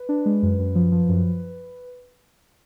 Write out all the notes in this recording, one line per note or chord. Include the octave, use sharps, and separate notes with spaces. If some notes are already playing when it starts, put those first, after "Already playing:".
Already playing: B4
D4
G#3
F#2
F#2
F3
F3
F#2